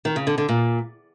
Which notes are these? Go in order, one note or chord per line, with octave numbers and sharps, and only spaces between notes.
D#3
C#3
D3
D3
A#2